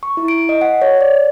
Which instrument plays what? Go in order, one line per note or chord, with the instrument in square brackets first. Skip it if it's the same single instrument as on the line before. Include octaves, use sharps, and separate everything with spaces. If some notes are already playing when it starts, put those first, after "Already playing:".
[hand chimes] C#6
E4
D7
D#5
F#5
C#5
D5